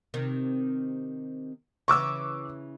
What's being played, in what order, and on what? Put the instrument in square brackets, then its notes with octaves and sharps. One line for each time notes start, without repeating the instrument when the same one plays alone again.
[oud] C3 D#3
[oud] C#3 E3 [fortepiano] C#6 D6 E6